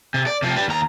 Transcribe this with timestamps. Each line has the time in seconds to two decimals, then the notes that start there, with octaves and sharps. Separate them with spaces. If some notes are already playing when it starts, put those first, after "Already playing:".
0.14 C3
0.27 D5
0.42 C3 F3
0.56 G3 B4
0.68 D#2 A#5